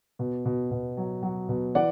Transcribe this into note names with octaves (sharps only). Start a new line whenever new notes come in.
B2
B2
B2
F#3
F#3
B2
E3 D5 F#5